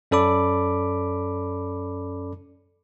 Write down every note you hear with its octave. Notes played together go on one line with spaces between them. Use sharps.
F#2 C#4 A4 D5 B5 D6